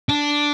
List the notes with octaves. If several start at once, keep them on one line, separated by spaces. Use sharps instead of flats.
D4